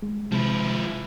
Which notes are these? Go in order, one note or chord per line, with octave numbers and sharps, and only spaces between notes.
G#3
C3 F3 G#3 E4